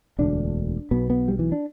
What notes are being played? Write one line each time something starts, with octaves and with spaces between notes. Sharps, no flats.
E1 D2 D3 D4
B1 B2 B3
B3
G3
E3
D4